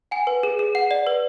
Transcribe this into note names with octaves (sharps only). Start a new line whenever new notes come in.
F#5 G#5
B4
G#4
G#4
F#5
D5
B4